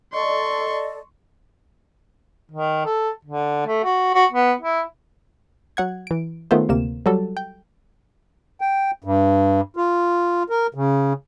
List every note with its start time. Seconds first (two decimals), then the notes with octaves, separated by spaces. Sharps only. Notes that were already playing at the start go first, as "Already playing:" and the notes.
0.13 A4 D5 D#5 C6 C#6
2.52 D#3
2.86 A4
3.25 D3
3.66 A3
3.84 F#4
4.15 F#4
4.32 B3
4.61 E4
5.77 F#3 F#5 G#6
6.07 E3 D7
6.51 D#3 A3 B3 F4 C5
6.69 D2 C3 A#3 E7
7.06 F#3 G3 F#4 A4
7.37 G5
8.61 G5
9.04 G2
9.77 F4
10.50 A#4
10.74 C#3